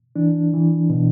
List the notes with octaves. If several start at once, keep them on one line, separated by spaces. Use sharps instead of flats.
E3 D4
E3
B2